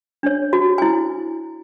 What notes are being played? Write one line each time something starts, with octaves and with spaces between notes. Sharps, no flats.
D4 C#5
F#4
E4 G#5